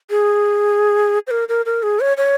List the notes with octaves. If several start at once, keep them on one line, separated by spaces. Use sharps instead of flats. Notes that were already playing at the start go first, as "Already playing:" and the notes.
G#4
C5
A#4
A#4
A#4
G#4
C#5
C#5